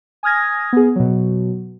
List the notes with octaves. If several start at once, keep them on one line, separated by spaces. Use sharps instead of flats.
G#5 D#6 F6 G#6 A#6
B3 G#4
B2 F#3